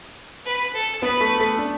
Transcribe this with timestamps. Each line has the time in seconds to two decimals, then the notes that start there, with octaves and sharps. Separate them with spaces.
0.45 B4
0.74 A4
1.02 B3 B4
1.21 A3
1.40 A3
1.58 D4